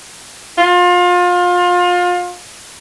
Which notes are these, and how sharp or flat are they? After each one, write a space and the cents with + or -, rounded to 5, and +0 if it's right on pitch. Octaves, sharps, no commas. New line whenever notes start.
F4 +30